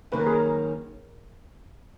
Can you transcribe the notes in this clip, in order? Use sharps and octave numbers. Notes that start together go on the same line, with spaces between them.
F#2 D#3 A#3 C#4 B4
A#4
G#4
A#4